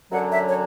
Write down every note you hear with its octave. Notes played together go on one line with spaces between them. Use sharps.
F#2 D3 F#3 F#5
E5
C#5